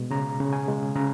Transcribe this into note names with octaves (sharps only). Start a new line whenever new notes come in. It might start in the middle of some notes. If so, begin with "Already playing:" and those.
Already playing: B2 G#3
C#3 A#5
C#3
G#5
G#3
C#3 A#5